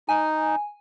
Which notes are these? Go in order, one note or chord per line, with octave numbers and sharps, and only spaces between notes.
D#4 G#5